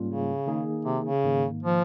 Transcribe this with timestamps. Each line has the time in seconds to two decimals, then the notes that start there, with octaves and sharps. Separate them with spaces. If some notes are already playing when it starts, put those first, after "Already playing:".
Already playing: G#2 G3 A#3 C#4 F4
0.08 C#3
0.46 D#3 A#3 D#4 G#4
0.85 C3
1.05 C#3
1.24 G#2 D#3 A#3
1.63 F3